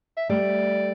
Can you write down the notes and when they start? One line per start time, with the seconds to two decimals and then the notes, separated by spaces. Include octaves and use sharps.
0.17 E5
0.29 G3 A3 D5